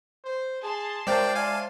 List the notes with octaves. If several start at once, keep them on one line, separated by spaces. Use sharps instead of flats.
C5
G#4 A5 C6
G#3 A#4 C5 D5 E5 G5
D5 F5 G#5